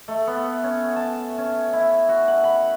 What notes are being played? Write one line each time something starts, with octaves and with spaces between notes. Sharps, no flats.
A3
B3
C#4
A5
C#4
E4
F#4
F#5
B5